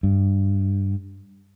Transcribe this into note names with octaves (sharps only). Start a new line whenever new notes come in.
G2